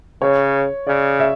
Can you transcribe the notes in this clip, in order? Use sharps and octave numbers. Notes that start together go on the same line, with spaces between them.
C#3 C#5
C#3 D5
E5